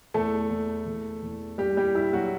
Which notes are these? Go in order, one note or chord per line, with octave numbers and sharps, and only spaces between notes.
E2 A3 A4
E2
E2
E2
G2 G3 G4
G3 G4
G2 E4
F#3 F#4